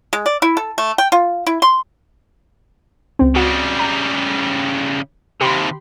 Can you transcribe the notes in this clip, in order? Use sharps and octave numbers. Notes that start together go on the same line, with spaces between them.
G#3
D5
E4
A4
A3
G5
F4
E4
C6
C#2 C4
C#3 G3 F#4
A#5
D#2 C3 G4 B5 C6